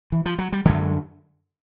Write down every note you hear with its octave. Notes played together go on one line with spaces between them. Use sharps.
E3
F3
F#3
G3
F#2 D3 F#3 G#3